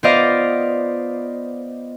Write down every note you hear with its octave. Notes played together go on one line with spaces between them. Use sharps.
B3 F4 C5 D5 D#5 F5